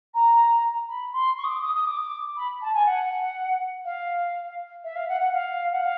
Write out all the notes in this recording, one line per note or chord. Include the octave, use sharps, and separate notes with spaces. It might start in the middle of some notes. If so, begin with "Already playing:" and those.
A#5
B5
C6
C#6
D#6
D6
D#6
D#6
D6
B5
A5
G#5
F#5
F5
E5
F5
F#5
F#5
F5
F#5
F5